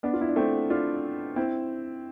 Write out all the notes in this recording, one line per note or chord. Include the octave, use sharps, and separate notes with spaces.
B3 D4
F4
E4
D4
A3 C4
D4 F4
C4 E4